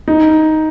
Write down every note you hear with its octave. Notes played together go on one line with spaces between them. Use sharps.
D#4